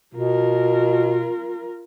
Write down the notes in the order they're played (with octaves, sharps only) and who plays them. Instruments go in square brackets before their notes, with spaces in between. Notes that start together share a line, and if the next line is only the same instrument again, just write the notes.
[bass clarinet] B2 [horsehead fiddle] F4 A#4